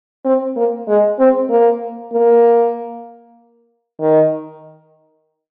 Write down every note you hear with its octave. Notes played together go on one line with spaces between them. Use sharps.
C4
A#3
G#3
C4
A#3
A#3
D#3